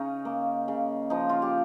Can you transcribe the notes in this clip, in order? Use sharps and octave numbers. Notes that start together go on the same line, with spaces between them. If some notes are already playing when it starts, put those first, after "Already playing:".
Already playing: C#3 C#4 D#4
A#3
C#3
F3 D#4
F4
G4